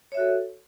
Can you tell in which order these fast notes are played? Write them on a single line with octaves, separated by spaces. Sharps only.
C#5 E5 F#4 A4